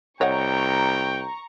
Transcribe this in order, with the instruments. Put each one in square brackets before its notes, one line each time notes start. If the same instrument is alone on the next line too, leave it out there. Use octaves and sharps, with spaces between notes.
[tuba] C2 [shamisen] C#5 D#5 F#5 [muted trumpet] G5 [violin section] A#5 C#6